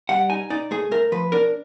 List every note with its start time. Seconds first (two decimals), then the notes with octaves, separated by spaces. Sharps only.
0.09 G3 F#5
0.29 D#4 G#5
0.50 D#4 D5
0.71 A3 G#4
0.91 A3 A#4
1.12 F3 B4
1.32 D4 A#4